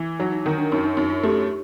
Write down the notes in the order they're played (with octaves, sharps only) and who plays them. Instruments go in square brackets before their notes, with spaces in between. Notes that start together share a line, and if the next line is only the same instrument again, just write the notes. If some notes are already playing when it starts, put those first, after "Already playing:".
Already playing: [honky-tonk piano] E3
[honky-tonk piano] F#3 [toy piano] D#4
[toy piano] D#4
[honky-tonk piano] D#3 [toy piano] D#4
[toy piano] D4
[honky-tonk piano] F#2 [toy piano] D#4
[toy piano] D#4
[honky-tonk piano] F#2 [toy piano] D#4
[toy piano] F4
[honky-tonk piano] A3 [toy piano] G4